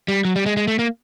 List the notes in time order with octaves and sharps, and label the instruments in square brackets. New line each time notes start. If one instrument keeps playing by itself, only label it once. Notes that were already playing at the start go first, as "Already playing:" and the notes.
[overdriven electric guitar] G3
F#3
G3
G#3
G#3
A3
A#3